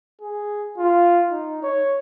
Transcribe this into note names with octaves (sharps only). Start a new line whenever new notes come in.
G#4
F4
D#4
C#5